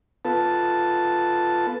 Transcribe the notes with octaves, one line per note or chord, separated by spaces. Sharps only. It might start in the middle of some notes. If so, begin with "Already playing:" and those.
B3 F4 A4 B4 A5